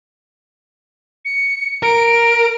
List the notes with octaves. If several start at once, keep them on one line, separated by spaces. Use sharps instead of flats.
C#7
A#4 D7